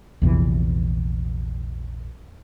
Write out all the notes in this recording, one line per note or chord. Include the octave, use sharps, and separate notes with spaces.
A#1 E2 C3 E3